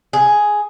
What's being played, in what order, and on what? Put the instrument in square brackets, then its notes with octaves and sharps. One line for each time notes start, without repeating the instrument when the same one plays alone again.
[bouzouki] G#4